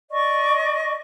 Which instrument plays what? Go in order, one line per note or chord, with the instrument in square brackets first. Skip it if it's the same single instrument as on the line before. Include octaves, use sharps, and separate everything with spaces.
[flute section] D5 D#5 C#6